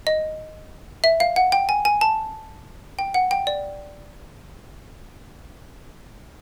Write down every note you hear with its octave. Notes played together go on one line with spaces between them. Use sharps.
D#5
E5
F5
F#5
G5
G#5
G#5
A5
G5
F#5
G5
D5